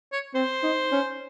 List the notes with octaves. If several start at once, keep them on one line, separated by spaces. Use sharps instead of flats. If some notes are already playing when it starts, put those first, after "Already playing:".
C#5
C4 C5
D#4
C#4